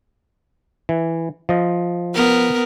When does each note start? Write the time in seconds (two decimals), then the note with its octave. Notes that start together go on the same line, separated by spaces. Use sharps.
0.89 E3
1.49 F3 D#5
2.14 B3 A#4